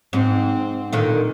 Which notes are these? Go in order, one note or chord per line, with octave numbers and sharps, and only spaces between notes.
G#2 C4
A#2 D3 D#3